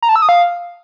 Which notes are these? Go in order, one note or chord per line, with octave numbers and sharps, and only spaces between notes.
A#5
A5
E6
D#6
F5